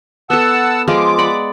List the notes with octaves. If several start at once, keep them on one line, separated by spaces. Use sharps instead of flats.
B3 A4 F#5 A5 E6
F3 G#3 F4 D6
D5 F#5 B5